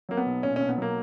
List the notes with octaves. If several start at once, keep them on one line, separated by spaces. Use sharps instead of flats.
F#3 A#3
B3
B1
A#2 C#4
B1 C#4
B3
F#3 A#3